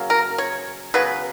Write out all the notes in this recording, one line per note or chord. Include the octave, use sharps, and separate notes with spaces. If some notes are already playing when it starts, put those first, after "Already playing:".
Already playing: C#3 F#3 A#3
A#4
C#5
C#3 F#3 B3 B4